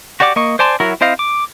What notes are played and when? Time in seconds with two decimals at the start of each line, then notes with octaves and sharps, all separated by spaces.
0.20 F#4 G4 D5 F#5 D6
0.36 A#3 D#5 C#6
0.59 C5 D5 G#5 A5 C6
0.80 F#3 E4 F#4 A#4
1.01 C4 E4 C5 D#5 F5
1.19 D6